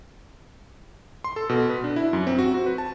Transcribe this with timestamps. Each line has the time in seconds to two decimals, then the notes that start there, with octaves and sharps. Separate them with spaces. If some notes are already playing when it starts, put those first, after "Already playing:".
1.24 C6
1.36 A4
1.49 B2
1.69 B4
1.84 D4
1.96 E4
2.13 F#2
2.27 C4
2.38 F#4
2.54 F#4
2.66 B4
2.78 A5